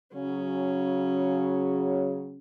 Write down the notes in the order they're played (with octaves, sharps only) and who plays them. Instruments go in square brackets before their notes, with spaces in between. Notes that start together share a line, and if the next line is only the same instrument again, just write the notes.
[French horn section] C#3 F#3 [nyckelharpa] C#4